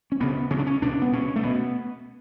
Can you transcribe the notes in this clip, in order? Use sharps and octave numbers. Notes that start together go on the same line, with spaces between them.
C#4
D2 C#3 B3
D2 C#3 C#4
D4
C#4
C#2 B2 D4
B3
C#2 B2 C#4
A3
B2 B3